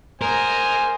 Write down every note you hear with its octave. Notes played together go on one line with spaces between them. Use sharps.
A#4 C5 D#5 G#5